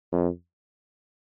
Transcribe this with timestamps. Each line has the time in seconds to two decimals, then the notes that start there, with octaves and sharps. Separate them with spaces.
0.12 F2